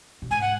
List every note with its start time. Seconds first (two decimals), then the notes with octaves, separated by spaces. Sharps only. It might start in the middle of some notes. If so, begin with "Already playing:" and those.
0.22 A#2
0.31 G#2 G#5
0.41 F#5